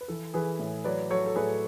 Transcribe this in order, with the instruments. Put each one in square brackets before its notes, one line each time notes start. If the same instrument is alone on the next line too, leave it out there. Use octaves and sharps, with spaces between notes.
[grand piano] B4
E3 A4
E3 G#4 B4
A2
F#3 B4 D5
F#3 A4 C#5
A4
A2 G#4 B4